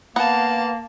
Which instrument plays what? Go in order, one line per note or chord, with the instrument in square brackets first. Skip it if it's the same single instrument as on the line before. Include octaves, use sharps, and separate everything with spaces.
[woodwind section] A#3 [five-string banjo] B3 F#5 [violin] F5 A5